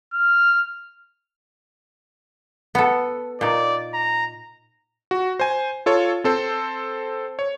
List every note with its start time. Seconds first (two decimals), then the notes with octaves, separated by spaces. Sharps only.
0.14 F6
2.75 B3 A4
3.41 A#2 D#4 D5
3.94 A#5
5.11 F#4
5.40 C5 G#5
5.86 F4 A4 C#5
6.24 C4 A4 C5
7.39 C#5